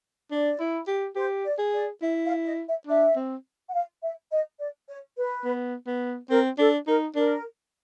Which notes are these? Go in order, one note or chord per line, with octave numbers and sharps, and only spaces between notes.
D4 D5
E4
G4
G4 C5
D5
G#4
D5
E4 E5
F5
D#5
E5
D4 E5
C4
F#5
F5
E5
D#5
D5
C#5
B4
B3
B3
C4 A#4
D4 A4
D#4 A#4
D4 A#4